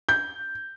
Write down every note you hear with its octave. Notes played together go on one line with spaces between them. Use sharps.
G6